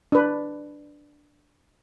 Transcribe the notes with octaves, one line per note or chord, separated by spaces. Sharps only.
D4 B4